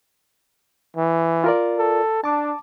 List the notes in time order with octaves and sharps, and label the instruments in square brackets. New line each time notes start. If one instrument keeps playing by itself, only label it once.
[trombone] E3
[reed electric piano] F4 A#4 D5
[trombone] A4
[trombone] D4 [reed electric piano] A5 D6